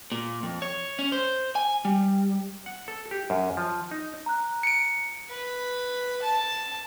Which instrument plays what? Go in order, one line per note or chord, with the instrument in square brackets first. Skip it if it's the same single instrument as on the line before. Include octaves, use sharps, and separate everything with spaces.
[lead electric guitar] A#2
F2
C#5
C#4
C5
G#5
G3
[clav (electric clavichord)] F#5
A4
G4
F#2
F3
D#4
[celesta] A#5 F#6
[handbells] C#7 D7
[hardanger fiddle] B4
A5